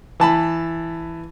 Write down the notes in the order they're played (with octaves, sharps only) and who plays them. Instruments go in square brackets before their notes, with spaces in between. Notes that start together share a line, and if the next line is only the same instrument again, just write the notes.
[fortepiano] E3 A5 B5